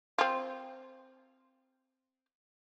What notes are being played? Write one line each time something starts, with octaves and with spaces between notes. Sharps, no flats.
C4 F4